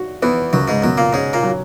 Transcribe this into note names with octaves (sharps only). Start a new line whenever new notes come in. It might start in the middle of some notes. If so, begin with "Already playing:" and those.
Already playing: F#4
E2 E3 B3
C#2 F#2 F#3
G#2 G#3
F#2 B2 F#3
A#2 A#3
G#2 G#3 C#4
A#2 A#3
F#3